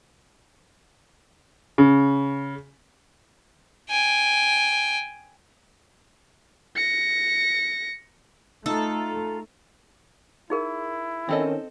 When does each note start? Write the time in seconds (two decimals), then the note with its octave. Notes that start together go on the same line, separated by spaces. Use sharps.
1.78 C#3
3.90 G5 G#5
6.76 A#6 C#7
8.66 A3 D#4 F4 A4 A#5
10.50 D#4 E4 G#4 A#4
11.29 D#3 C4 C#4 A4 D#5